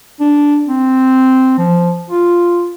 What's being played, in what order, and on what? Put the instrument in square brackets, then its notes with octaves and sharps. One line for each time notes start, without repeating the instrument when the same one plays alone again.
[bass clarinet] D4
C4
F3
F4